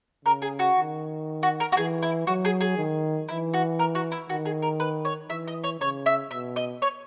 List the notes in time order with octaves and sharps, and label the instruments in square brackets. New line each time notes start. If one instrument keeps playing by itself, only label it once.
[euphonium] C#3 [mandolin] A#4
[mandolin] G#4
F#4
[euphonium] D#3
[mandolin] F#4
A#4
F#4
[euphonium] E3 [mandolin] G#4
[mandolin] E4
[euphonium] F#3 [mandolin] F#4
[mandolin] G#4
G#4
[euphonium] D#3
[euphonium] E3 [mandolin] E4
[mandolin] F#4
A#4
F#4
E4
[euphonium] D#3 [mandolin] F#4
[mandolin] G#4
A#4
B4
C#5
[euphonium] E3 [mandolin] E5
[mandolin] D#5
C#5
[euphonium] C#3 [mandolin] C#5
[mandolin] E5
[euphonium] B2 [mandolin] E5
[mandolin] D#5
C#5